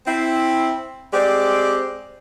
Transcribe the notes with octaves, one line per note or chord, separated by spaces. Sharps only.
C4 E4
G#3 C4 G4 D5